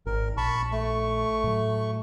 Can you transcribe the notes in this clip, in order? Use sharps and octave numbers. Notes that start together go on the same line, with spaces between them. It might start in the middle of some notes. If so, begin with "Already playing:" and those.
G#1 A#4
A#1 A5 B5 C#6
A3 C#6
A2 F#3